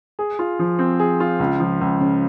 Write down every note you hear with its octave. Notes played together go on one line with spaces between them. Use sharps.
G#4
F4
F3
C4
G#4
F4
C#2
F3
C#2
C#3